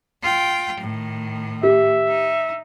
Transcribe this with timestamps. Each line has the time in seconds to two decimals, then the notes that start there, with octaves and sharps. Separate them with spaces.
0.22 F4 G5
0.80 A2 D#3
1.63 G4 E5
2.08 D#4